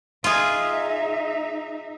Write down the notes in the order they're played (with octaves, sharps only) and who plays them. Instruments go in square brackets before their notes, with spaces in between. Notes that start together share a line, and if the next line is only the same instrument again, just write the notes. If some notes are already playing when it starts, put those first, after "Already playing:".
[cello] D#4 E5 [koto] F4 G#4